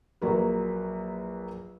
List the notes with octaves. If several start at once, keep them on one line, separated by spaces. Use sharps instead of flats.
A#1 F#3 A#3 B4